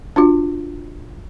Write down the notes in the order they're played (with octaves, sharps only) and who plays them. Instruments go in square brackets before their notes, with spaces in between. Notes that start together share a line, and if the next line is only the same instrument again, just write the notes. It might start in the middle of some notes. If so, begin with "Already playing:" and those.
[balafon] D4 F4 F#4